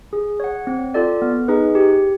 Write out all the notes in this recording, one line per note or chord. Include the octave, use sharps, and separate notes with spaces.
G#4
C#5 F#5
C4
F4 A4 D5
B3
D#4 G#4 B4
G4